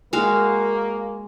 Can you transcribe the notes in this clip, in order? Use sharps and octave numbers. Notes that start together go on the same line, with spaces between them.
G#3 A#3 F#4 F5